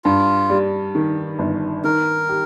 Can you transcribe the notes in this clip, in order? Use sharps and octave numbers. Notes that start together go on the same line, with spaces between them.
G2 F4
G3
D#3
G1
D#3 A#4
G4